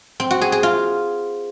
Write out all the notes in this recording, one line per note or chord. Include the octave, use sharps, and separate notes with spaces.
C4
F#4
G#4
G#4
F4